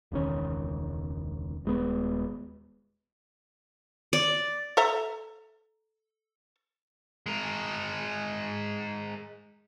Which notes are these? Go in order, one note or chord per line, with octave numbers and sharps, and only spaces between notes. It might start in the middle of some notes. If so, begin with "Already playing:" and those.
E1 C#2 D#3 C#4
D#1 G#3 B3
D5
A4 E5 A#5
G#3 A#4